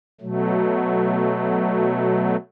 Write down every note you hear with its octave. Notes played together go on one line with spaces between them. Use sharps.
B2 F#3 A3